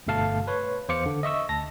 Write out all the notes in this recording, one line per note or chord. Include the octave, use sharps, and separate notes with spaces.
G1 G2 B2 A3 F5 A5
B4 C#5
E2 C5 F5 D6 C#7
D3
D#5 E5 C#6 E6
D2 A5 A#6